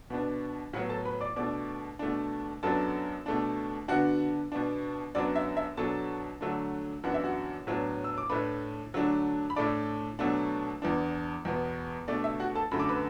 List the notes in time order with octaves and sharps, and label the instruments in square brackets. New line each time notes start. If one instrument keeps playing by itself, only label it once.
[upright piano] B2 B3 D4
A2 F#3 B3 F#4 F#5
A4 A5
B4 B5
D5 D6
B2 A3 D4 D5 D6
B2 A3 D4
F#2 F#3 B3 D4 A4 A5
B2 A3 D4
D3 B3 D4 F#4 F#5
B2 B3 D4
F#2 F#3 B3 D4 D5
E5
E5
B2 F#3 D4 A4 A5
D3 F#3 A3 D4
F#2 E3 B3 D4 F#5
E5
F#4 F#5
A2 F#3 B3 D4
E6
D6
A2 A3 D4 B4 B5
D3 F#3 A3 D4
B5
A2 A3 D4 D5 D6
B2 F#3 A3 D4
E2 E3 D4
E2 B2 B3
B2 A3 D4 D5
E5
F#4 F#5
A4 A5
F#2 D3 A3 B5
D6
B4 B5